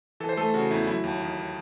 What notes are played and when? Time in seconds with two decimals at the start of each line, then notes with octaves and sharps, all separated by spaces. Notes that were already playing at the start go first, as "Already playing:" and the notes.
0.20 E3 A4
0.29 C5
0.37 A3 A4
0.54 C#3 F#4
0.71 E2 E4
0.87 F#3 E4
1.04 D#2
1.20 D#3